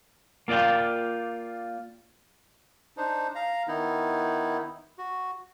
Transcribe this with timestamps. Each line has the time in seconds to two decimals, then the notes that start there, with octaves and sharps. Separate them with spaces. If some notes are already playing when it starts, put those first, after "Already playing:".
0.48 A#3 F4 D5 F5 G5
2.97 D4 D#4 C5
3.35 F5 A#5
3.68 D#3 B3 D#4 E4
4.98 F#4